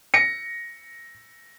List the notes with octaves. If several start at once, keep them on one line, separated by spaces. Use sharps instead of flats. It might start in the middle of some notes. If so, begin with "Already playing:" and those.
A#6 C#7